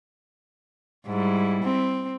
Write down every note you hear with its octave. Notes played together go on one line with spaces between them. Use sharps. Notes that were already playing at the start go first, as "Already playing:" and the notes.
G#2 G3 E4
C4